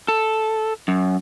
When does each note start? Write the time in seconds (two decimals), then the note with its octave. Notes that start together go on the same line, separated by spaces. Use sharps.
0.08 A4
0.88 F#2